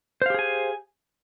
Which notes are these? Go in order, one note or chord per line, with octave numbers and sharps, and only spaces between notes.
G4 G#4 C5 F5 G#5